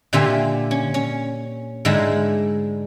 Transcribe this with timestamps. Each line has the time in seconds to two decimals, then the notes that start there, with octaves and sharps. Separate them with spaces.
0.13 A#2 D3 F4 G4 E5 G#5
0.71 C#4
0.94 C#4
1.85 G#2 D3 G#3 A3 E4 G#5